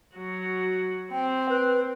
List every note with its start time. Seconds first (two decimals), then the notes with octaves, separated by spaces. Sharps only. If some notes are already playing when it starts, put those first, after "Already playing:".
0.16 F#3 F#4
1.12 C4 G5
1.49 B4